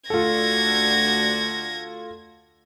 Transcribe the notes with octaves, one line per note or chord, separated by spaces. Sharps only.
D2 D4 F4 F#4 A4 G#6 A#6